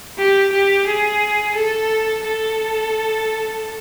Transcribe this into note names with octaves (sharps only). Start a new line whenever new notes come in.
G4
G4
G#4
A4
A4